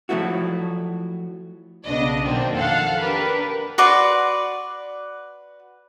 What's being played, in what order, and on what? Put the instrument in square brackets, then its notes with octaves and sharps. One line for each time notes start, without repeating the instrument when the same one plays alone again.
[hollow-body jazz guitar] F3 F#3 A3 E4 F#4
[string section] B1 C#3 B3 D4 D#5
B2 D#3 F#3 A#3 C4 D4
F2 A4 F5 F#5
D4 G4 A#4 B4
[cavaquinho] F#4 B4 D5 C6